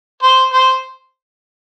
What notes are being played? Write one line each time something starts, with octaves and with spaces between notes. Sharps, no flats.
C5
C5